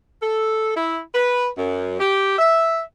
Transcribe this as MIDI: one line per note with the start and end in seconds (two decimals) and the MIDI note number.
0.22 0.73 69
0.76 1.00 64
1.15 1.47 71
1.57 1.97 42
2.00 2.38 67
2.38 2.81 76